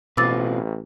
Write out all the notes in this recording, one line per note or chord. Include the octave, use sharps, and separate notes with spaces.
A1 B2 C4 F4 B4 D6 E6 A6